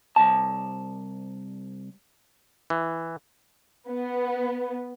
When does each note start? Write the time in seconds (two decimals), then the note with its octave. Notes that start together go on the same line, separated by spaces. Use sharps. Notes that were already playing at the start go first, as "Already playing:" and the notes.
0.16 C2 G2 A5
2.70 E3
3.89 B3